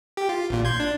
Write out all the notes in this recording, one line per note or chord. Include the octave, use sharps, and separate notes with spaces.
G4
F4
A1 A#2
C6 G6 G#6
D4